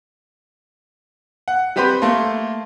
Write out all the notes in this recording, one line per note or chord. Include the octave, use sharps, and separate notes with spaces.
F#5
G3 C4 G4 B4 C5
A3 A#3 C6